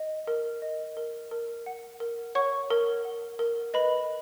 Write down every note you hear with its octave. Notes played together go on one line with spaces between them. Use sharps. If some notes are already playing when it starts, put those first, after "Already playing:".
Already playing: D#5
A#4
D#5
A#4
A#4
F#5
A#4
C#5 F#5 C#6
A#4
F#5
A#4
B4 D#5 B5